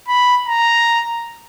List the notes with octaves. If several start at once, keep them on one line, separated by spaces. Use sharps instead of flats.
B5
A#5